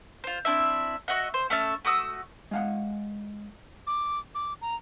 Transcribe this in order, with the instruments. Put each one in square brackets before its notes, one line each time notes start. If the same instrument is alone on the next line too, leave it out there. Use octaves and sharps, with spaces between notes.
[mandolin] F4 C5
C4 D4 E4 E5
F#4 D#5 E5 F#5
C5
A3 C#4 E5 A5
A3 F#4 D#6 E6
[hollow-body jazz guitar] G#3 F5 F#5
[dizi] D6
D6
A#5